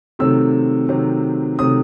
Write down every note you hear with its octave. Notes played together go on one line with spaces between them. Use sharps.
C3 D#3 F#3 A3 C4 E6
C3 D#3 F#3 A3 C4
C3 D#3 F#3 A3 C4 D#6